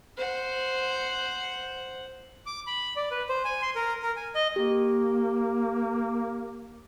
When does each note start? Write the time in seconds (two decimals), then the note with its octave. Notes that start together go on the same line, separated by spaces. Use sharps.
0.18 C5 F#5
2.46 D6
2.67 B5
2.96 D5
3.11 B4
3.29 C5
3.44 G#5
3.62 C6
3.76 A#4
4.02 A#4
4.16 G#5
4.35 D#5
4.56 A#3 G4